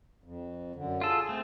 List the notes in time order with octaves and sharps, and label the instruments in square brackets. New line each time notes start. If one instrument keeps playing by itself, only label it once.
[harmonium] F2
F#2 D3
[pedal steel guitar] F4 A4 [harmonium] G#4
[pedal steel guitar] A3 C4